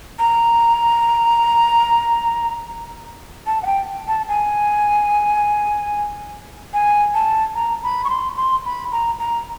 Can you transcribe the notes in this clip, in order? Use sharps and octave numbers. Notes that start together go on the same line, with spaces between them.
A#5
A5
F#5
G5
A5
G#5
G#5
A5
A#5
B5
C#6
C6
C6
B5
A#5
A#5